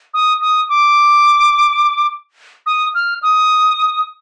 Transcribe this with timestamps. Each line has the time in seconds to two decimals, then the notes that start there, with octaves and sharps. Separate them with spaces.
0.14 D#6
0.41 D#6
0.69 D6
2.66 D#6
2.95 F6
3.23 D#6